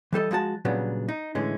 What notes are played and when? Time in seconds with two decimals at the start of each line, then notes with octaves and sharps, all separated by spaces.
0.13 E3 G3 A4 D#5
0.31 F3 G#3 F#4 A5
0.65 A#2 C#3 F#3 G3 B3 D4
1.08 D#4
1.35 A2 D3 E3 G#3 C#4